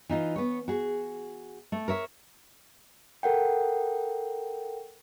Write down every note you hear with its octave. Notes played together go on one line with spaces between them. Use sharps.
E3 D#4 F4
B3 C#5
F#4 G#4
A3
A#4 C#5 E5
A4 A#4 F#5 G5